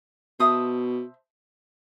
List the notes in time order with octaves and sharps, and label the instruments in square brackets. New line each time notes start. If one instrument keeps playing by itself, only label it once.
[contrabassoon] B2 [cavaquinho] C5 E5 A5 D#6